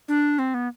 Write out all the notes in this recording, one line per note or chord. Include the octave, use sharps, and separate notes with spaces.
D4
C4
B3